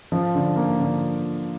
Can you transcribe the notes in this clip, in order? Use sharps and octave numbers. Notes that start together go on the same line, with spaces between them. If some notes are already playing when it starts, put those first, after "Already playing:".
F3
D3
A#3
D3